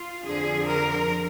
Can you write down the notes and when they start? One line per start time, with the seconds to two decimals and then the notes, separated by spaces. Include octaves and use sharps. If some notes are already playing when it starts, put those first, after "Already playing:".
Already playing: F4
0.23 F2 D3 F3 G#4
0.66 A#4